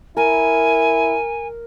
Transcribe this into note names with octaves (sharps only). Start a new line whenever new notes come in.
E4 A#4 G#5